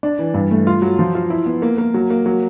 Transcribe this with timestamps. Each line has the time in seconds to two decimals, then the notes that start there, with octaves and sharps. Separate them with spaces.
0.03 D4
0.19 E3
0.34 G2
0.51 A3
0.67 F4
0.82 F#3
0.99 F3
1.15 F4
1.30 E4
1.46 B3
1.62 A#3
1.78 A#3
1.94 F#3
2.10 A#3
2.26 F#3